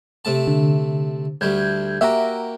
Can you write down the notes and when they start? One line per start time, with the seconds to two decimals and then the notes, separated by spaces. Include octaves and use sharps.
0.25 C3 A3 A5
0.47 D3
1.41 D2 G3 A3 G6 G#6
2.01 A#3 F#4 G4 E5 F#5 A#5